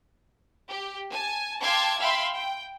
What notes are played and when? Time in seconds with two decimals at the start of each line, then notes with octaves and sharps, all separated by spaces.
0.70 G4
1.11 G#5 A5
1.61 F5 G5 A5 C6 D6 G#6
1.99 E5 F5 G5 B5 C6
2.34 G5